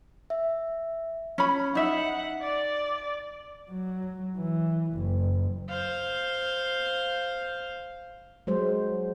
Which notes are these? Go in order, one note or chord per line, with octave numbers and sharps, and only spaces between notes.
E5
C#4 B5
D#4 E5 F#5
D5
F#3
E3
F#1
C5 F5
F#3 G#3 C5